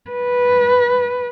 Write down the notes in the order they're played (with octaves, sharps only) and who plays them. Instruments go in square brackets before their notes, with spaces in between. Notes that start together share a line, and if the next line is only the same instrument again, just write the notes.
[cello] B4